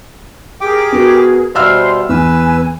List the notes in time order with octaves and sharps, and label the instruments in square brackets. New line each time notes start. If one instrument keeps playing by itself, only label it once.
[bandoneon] G4 G5 D6 [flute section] G#4 A#4
[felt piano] B3 F#4
[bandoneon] B2 G3 [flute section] C5 C6 [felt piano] E5 E6 F6
[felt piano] E2 [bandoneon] B4 E6 [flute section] G#5